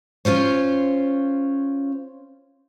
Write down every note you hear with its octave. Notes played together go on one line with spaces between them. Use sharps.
C#4 F4 C5 C#5